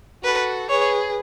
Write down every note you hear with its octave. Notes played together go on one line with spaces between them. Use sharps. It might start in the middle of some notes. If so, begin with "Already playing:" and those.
F#4 A4 B4
G#4 B4 C#5